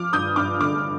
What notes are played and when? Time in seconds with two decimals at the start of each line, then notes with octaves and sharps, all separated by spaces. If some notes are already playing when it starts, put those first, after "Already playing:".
Already playing: F3 D6 F6
0.13 G2 D#6 G6
0.36 G2 D6 F6
0.60 D3 D6 F6